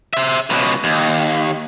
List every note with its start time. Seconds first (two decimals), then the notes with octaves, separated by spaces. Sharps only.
0.13 C5 E5
0.50 C#2 B2
0.84 D#2